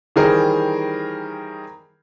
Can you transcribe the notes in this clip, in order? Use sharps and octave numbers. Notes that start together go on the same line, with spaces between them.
D#3 E3 G3 G#4 A#4 C5